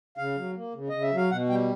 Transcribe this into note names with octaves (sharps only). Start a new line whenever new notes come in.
C#3 F5
F#3
A#3
C#3
C#3 D#5
E5
F#3
F5
B2 F#5
G3 G5